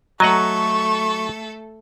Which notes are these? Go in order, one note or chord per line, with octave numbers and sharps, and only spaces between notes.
F#3 A3 A4 D#5 F#5 A#5 C#6